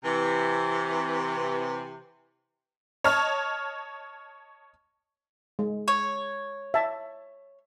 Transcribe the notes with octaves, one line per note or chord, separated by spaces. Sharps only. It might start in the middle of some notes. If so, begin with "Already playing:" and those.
C3 E3
C#5 D#5 A5 F6
G#3
C#5
E5 A5